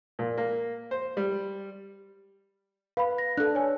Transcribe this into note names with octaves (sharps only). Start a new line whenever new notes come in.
A#2
A#3
C5
G3
B4 F5 B5
A#6
D4 A4 F#6
C#5 G#5